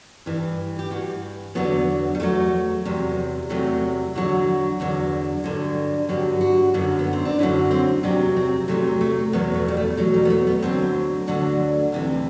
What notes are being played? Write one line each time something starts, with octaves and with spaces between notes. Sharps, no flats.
G2 E3
G4
G2 E3 F#4
E2 D3 F#3 B3
G3
E2 D3 F#3 A3
E2 C3 F#3
E2 C3 F#3 A3
E2 D3 F#3 F#4
E2 D3 F#3
G2 D3 F#3
G2 D3 F#3 G4
F#4
F#2 D3 F#3
B3
C4
D4
F#2 D3 F#3 E4
C4
E2 C3 F#3 D4
C4
E2 C3 F#3 A3
A3
E2 B2 F#3 B3
A3
G3
A3
E2 B2 F#3 A3
G3
B3
A3
B3
D2 D3 F#3 C4
D2 D3 F#3 D4
D2 C3 E3